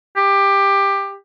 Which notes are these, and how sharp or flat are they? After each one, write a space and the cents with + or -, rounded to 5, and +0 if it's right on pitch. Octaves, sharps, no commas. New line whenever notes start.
G4 +15